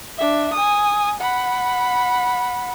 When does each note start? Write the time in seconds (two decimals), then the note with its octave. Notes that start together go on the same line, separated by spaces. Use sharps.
0.17 D4 E5
0.54 G#5 D#6
1.20 F#5 B5